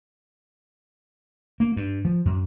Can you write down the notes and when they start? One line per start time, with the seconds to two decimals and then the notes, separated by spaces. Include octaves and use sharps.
1.60 A#3
1.76 G2
2.05 F3
2.25 F#2